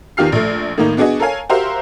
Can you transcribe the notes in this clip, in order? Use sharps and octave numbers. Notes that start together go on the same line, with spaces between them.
E2 D#3 F4 G4 F6 C7
A#1 A3
A2 D#3 A#3 D#4
B3 D4 F#4 G#4 D#5
A4 A#4 C#5 F5 G#5
F#4 G4 A#4 C5 E5 F5